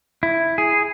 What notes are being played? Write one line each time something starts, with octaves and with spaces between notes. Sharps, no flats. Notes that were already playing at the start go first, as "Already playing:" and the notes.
E4
G#4